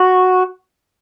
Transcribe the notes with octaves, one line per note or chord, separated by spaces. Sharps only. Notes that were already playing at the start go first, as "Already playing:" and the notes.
Already playing: F#4